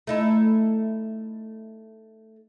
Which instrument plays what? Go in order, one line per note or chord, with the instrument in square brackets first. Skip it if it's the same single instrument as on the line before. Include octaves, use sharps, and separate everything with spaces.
[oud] A3 D#4 E4